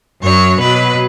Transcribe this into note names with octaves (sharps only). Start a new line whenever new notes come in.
F#2 F#3 C#5
B2 F#3 B4